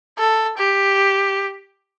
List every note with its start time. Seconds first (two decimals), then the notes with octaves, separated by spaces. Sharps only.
0.18 A4
0.58 G4